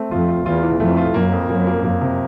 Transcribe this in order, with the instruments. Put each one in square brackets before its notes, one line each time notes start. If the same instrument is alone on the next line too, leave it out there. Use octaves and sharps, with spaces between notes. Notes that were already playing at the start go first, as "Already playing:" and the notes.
Already playing: [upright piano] A3 C4
[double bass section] F2 [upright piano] F4
[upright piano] F4
[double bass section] E2 [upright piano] F4
[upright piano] E3
[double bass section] F2 [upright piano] A3
[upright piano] F4
[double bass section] F#2 [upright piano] A#3
[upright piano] F2
[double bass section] F#2 [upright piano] A#3
[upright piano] A#3
[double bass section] F#2 [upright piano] A#3
[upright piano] C3